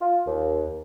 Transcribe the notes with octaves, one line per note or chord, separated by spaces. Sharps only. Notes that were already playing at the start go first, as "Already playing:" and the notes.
F4
D#2